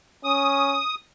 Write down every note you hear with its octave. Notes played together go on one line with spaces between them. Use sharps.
C#4 D#6